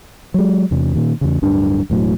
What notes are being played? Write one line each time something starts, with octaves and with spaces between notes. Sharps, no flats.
F#3 G#3
E2 C3
A#2 D#3
E2 C#3
D1 G2 D4
E1 A2 F#3